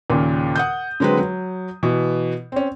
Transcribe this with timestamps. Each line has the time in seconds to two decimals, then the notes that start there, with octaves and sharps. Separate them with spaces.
0.10 D#2 A#2 C#3
0.55 F#5 D#6 G6
1.00 D3 F#3 G#3 C4 B4
1.19 F#3
1.83 B2 E3
2.52 C4 C#4